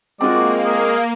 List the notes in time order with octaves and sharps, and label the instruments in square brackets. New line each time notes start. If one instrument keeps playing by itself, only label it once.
[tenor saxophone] G#3 [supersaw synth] A#3 [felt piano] C4 F4 [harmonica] F#4 D5
[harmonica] G#4